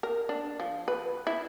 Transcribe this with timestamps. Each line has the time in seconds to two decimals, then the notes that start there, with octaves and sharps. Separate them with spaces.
0.03 A#4
0.29 D4
0.60 F3
0.88 B4
1.27 E4